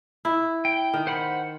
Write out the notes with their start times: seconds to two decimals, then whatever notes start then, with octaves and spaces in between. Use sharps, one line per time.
0.25 E4
0.65 G5
0.94 D#3
1.07 C5 F#5 B5